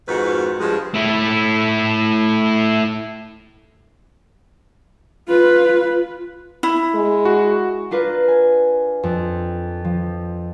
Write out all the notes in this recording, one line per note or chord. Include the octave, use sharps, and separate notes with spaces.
F2 G#2 D#3 F#4 B4
G2 F3 G#3
A3 E4
F4 B4
E4
G#3
F#4
D4 F4 A#4 B4
G#5
F2
F3